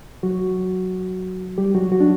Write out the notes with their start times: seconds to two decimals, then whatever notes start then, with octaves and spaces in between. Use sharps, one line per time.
0.23 F#3 F#4
1.58 G3 G4
1.75 F#3 F#4
1.91 F#3 F#4
2.00 D4